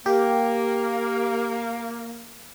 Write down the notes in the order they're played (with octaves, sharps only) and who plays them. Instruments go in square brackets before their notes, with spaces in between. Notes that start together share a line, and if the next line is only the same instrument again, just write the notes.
[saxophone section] A#3 [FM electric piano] G4